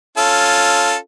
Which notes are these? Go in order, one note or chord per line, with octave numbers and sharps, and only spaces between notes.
C#4 F4 A4